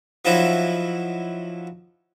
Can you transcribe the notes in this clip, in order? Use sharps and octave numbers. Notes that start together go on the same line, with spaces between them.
F3 F#3 D#4 E4